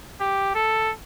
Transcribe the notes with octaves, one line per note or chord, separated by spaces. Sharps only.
G4
A4